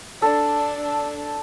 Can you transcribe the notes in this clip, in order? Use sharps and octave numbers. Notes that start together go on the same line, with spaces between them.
D4 A4